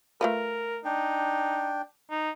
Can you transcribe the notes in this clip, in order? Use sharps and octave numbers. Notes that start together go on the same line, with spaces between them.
A3 F4 A#4 B4
D4 D#4 G5
D#4